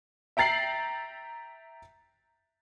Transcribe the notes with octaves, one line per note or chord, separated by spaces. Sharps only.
E5 G5 A#5 A6 C7 F#7